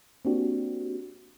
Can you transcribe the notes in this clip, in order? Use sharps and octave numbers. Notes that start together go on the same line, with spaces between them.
A#3 C4 D4 F#4 G4